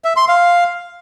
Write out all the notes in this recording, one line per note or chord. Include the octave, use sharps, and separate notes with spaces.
E5
C6
F5